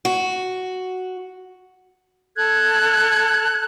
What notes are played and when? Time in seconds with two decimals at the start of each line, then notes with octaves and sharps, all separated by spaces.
0.05 F#4
2.36 A4 F#6 G#6